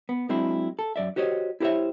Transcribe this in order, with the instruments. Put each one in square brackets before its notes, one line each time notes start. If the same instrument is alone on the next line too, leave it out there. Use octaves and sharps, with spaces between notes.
[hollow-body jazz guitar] B3
F#3 G#3 C4 D4 E4
A4
F#2 D5 E5
F#4 G4 C5 C#5 D#5
E4 G4 A#4 C5 C#5 E5